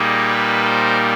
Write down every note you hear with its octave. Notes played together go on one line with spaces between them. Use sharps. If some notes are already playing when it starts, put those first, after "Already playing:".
Already playing: A#2 G3 A#3 D#4 G#4
B4
C5